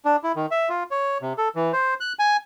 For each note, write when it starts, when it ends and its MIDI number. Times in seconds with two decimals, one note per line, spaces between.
0.05 0.16 62
0.23 0.32 64
0.36 0.46 51
0.51 0.69 76
0.69 0.83 65
0.91 1.18 73
1.22 1.33 48
1.38 1.48 69
1.55 1.72 52
1.73 1.94 72
2.00 2.13 90
2.19 2.37 80